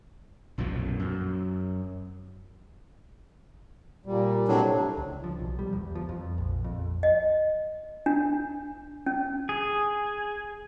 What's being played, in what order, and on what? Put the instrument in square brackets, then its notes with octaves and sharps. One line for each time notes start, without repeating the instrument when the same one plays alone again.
[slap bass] B1 F#2 A#2 F3
F#2
[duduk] A#2 [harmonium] G3
[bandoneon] A2 C3 F#3 [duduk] D4
[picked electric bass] C#2
F3
B1
G3
E2
F3
F2
A#1
F2
[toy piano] D#5
D4
C#4
[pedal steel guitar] G#4